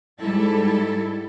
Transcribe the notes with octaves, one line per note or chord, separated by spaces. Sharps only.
G#2 G3 E4 A4